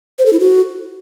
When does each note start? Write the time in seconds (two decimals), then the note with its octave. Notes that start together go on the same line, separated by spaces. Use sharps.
0.19 C5
0.26 A4
0.33 E4
0.40 F#4